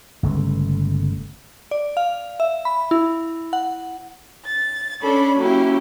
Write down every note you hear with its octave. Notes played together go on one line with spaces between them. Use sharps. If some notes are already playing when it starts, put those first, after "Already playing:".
G1 C#3 G#3 A3
D5
F5
E5
B5
E4
F#5
A6
C#4 D4 A4 C#5 B5
F#3 A#3 C#4 E4 G4